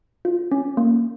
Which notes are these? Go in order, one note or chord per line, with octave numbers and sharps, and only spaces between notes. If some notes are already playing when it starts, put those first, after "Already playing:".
F4
C#4
A#3